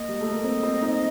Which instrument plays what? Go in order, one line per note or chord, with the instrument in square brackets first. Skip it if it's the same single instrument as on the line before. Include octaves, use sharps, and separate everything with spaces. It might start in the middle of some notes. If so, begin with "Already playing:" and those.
Already playing: [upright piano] A#3 [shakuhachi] D#5
[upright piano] G3
A3
A#3
C4
C4
D#4